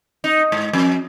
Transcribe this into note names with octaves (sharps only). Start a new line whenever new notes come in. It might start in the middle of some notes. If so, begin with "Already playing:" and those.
D#4
G#2
F2